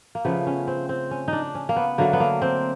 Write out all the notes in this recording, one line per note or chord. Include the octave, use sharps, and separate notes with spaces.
A#3
C#3 F3 A3 B3
C#4
C4
C4
C#4
D4 D#4
C#4
A#3
B3
D3 F#3 A3 A#3
B3
A#3
C4